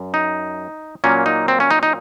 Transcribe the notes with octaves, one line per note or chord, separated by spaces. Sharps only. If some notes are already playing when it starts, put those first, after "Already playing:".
Already playing: F#2
D#4
A#2 F#3 A#3 C#4
D#4
C4
C#4
D#4
D#4